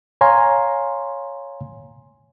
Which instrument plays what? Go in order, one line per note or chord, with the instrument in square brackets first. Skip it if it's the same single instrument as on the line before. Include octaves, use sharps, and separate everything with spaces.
[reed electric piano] C#5 F5 G#5 A#5 C6